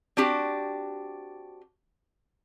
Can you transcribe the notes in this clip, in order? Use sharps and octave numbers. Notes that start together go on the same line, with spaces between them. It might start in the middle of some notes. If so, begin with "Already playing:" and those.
C4 D4 F#4 G4